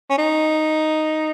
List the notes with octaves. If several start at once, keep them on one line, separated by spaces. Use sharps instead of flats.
C#4
D#4